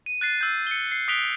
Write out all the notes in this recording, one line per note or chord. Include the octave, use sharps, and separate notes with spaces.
D#7
F#6 A6 C7
E6 G6
C#7 G7
C7
D#6 F#6 B6 D7 F7 G7